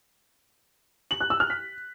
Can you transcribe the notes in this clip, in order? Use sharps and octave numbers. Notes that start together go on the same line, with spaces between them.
F#7
F#6
E6
F6
B6